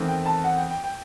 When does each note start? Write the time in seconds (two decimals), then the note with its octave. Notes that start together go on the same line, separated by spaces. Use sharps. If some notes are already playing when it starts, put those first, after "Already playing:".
Already playing: E2 D#3 A3 C4
0.08 G5
0.26 A5
0.44 F#5
0.57 G5
0.70 G5
0.84 G5